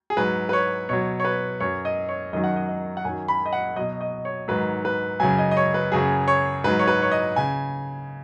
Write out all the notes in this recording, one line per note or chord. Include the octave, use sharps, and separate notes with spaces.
G#4
G#2 F#3 B4
B4
C#5
B2 F#3 C#5
C#5
B4
F#2 F#3 C#5
D#5
C#5
F#2 D#3 F#3 D#5
F#5
D#5
D#5
F#5
F#2 D#3 F#3 G#5
B5
D#5
F#5
B2 F#3 D#5
D#5
C#5
G#2 D#3 F#3 B4
B4
F#2 C#3 F#3 G#5
D#5
D#5
C#5
B4
F#2 C#3 F#3 G#4
C#5
G#2 F#3 B4
C#5
B4
C#5
D#5
C#3 G#5